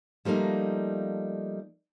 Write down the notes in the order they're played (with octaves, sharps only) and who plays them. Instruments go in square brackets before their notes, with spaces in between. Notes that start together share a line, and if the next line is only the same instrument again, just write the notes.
[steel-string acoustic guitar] F3 G3 A3 A#3 D#4